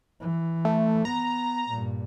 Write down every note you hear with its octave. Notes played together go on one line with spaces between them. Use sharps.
E3
A3
B3 A#5
G2 A#2